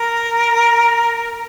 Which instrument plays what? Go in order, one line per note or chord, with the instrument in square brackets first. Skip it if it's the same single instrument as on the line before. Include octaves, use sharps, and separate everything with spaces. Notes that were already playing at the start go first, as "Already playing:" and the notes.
Already playing: [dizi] A#4